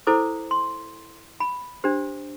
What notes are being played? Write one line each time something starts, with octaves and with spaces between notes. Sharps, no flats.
E4 A4 C5 D6
C6
B5
D4 G4 C5